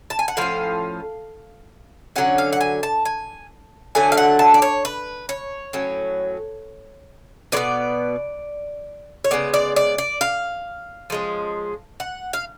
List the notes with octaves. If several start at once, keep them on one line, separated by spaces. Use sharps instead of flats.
A5
G#5
F#5
A2 F3 C#4 F5
D3 F#3 C#4 F#5
F5
F#5
G#5
A5
G#5
D3 F#3 A3 G#5
F5
F#5
A5
D5
C#5
B4
C#5
A2 F#3 C#4
B2 G#3 B3 D5
C#5
C#3 G#3 B3 D5
D5
D5
D5
F5
F3 G#3 C#4
F#5
F5